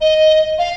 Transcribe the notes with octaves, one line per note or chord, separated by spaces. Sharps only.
D#5
F5